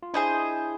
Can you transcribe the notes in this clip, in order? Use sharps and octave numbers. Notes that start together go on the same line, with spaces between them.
F4
D4 E4 G#4 C5 D#5